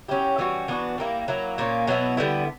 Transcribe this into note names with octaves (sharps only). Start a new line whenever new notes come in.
F#3 C#4 E4 G4
E3 G3 C#4 F#4
E3 B3 D4 F#4
G3 A#3 E4
F#3 A#3 E4
A#2 A#3 C#4
B2 F#3 B3 E4
D3 G3 B3 E4